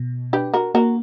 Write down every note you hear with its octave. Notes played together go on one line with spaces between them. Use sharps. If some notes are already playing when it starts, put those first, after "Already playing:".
Already playing: B2
D4 G4 B4
F#4 A#4
A#3 F#4 A#4